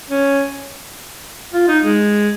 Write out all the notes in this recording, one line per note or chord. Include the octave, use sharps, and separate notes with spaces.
C#4
F4
D#4
G#3